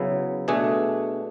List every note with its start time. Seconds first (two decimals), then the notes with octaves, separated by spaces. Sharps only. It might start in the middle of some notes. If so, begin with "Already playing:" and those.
Already playing: C#3 F#3 B3 E4
0.48 B2 A3 D4 G#4